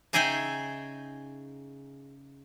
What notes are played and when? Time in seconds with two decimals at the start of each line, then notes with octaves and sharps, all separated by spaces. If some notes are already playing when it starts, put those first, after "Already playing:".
0.13 C#3 D#4 G#4 E5 G5 G#5